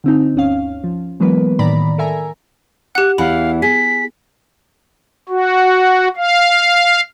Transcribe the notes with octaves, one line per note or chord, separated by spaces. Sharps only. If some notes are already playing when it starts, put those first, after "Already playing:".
D3 C4 D#4
G1 D2 C#4 F5
F3
E3 F#3 G#3 A#3 B3 B4
A2 D#3 D5 A#5 B5
A4 A#4 E5 G#5 A#5
G4 F#5 F#6
E2 E3 F5 F#5 B5
G#4 B6
F#4
F5